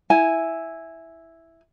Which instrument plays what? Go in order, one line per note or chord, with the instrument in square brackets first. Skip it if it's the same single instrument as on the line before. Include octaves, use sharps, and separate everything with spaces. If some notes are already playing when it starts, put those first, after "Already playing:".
[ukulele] E4 G#5